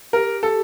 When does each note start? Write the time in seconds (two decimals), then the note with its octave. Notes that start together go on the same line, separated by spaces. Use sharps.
0.13 G4 A#4
0.43 A4